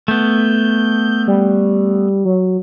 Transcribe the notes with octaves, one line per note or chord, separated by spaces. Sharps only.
A3 B3 G6
G3
F#3